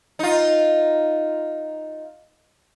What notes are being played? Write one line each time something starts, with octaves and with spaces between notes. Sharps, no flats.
D#4 F4